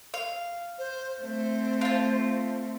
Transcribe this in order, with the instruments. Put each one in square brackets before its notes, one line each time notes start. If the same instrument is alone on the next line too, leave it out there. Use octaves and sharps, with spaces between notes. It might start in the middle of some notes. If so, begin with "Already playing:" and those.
[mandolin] F5
[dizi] C5
[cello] A3 C4 [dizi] C5
[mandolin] F4 A5